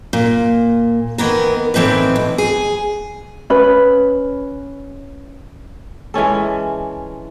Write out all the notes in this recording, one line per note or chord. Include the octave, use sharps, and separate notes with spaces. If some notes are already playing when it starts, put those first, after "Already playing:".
A#2
D#3 E3 B3 A#4
A2 E3 C4 D#4 B4
B2
G#4
C#4 B4
E3 G#3 C#4 A4